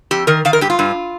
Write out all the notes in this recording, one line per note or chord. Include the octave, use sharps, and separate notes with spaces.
F2 G4
D#3 A#4
D#3 F5
A#4
G2 G4
F4
G2